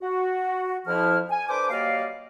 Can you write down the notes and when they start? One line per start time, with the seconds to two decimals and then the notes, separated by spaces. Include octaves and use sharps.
0.01 F#4
0.87 F2 F3 E4 F6
1.30 G#5
1.49 D4 A4 B4 C5 D6
1.70 F#3 G3 A#3 D5 D#5 F5